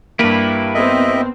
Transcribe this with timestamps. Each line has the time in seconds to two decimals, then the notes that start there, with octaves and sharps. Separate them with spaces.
0.19 G2 A#3 E4 G4 B4
0.75 B3 C4 D#5 E5